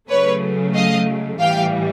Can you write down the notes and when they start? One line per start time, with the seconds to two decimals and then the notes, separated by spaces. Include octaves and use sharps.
0.09 C#3 F#3 A3 B4 C#5
0.74 D#5 F5
1.39 A2 E3 G3 F5 G5